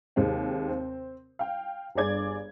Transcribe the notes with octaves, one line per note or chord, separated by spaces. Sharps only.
D#2 C3 D#3 G#3 C4
C4
F5 G5
G1 G2 G#4 D5 G#6